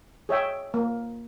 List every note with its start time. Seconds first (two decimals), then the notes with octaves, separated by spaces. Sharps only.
0.29 G#4 C#5 E5 G5
0.74 A#3